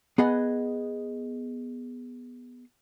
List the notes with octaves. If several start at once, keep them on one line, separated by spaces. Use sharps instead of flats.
B3 G#4 D#5 F#5